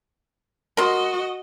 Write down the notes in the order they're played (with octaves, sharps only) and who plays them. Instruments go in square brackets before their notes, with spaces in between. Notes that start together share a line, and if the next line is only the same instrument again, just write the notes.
[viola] F#4 D#5 [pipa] A#4 C6